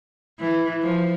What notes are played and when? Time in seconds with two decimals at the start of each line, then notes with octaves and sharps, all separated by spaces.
0.39 E3
0.83 F3